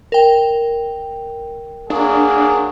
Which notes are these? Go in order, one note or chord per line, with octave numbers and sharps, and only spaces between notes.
A#4 G5
F#3 A#3 D4 G#4